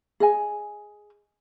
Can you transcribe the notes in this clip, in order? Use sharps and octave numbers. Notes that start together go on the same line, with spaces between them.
G#4 D#5 G#5